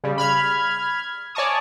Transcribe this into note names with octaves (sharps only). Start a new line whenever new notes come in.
C#3 G3
B5 F6 G#6
C#5 D5 G#5 A5 C#6 D#6